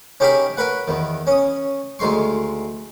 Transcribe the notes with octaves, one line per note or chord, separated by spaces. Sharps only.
C#4 D#4 G4 G#4 A#4 B5
F#4 A#4 B4 F#5
E2 D#3
C#4 D#6
D2 D#3 G#3 C6 C#6